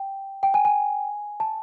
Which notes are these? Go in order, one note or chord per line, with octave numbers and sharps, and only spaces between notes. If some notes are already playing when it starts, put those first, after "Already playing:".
Already playing: G5
G5
G#5
G#5
A5